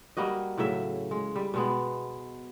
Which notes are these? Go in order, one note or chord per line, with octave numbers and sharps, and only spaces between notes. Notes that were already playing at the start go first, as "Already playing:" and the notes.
G3 A#3 F#4 D#5
A2 C#3 F#3 E5
G#3
G3
B2 G#3 B3